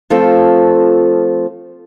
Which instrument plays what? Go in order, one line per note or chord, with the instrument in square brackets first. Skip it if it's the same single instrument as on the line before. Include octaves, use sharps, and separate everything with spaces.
[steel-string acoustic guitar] F3 A3 C4 F4 A4